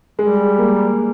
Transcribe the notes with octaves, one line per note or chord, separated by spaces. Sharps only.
G3 G#3
A#3